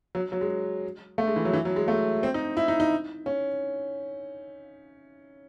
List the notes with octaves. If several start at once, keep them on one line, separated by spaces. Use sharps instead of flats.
F#3
F#3
G#3
A3
G#3
E3
F#3
E3
F#3
G#3
A3
C4
D#4
E4
D#4
D#4
C#4